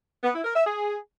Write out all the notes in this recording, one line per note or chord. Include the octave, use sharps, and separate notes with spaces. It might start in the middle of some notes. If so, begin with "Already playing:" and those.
B3
E4
A#4
E5
G#4